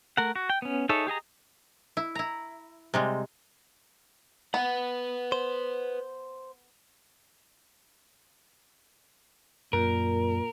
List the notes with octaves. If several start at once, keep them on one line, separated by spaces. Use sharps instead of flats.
A3 A#4 F#5
F#4
G5
B3 C#4
D#4 G#4 A4 C#5 E5
G4 G#4 D#5 A#5
E4
E4 A#5
C3 G3 G#3
B3 B4 F#5
C5
F#2 A#2 A#4